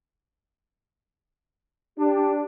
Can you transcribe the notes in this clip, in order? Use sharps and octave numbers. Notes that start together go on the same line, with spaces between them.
D4 G4